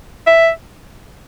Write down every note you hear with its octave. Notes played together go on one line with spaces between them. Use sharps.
E5